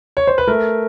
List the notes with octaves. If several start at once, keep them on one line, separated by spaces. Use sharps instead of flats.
C#5
C5
B4
A3 A#4